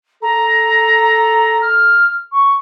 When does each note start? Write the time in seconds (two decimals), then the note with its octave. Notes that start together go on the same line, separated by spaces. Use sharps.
0.22 A4 A#5
1.62 F6
2.32 C#6